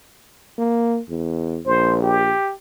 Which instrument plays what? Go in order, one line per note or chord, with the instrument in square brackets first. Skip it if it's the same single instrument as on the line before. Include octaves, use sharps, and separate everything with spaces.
[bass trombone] A#3
E2
[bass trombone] A#1 [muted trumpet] C5
[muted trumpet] G4